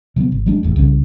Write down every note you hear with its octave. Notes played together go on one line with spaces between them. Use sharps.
C3 F#3 A#3 B3
G#1
F#3 G#3 D4
F1 E2 A2
C2 C#3 E3 C#4